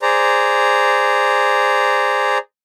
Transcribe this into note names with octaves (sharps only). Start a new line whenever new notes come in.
G#4 C5 D5 A#5